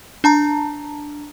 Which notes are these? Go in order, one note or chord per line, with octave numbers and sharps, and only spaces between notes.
D4 A5 A#5